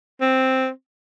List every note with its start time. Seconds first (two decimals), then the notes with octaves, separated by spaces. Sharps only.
0.21 C4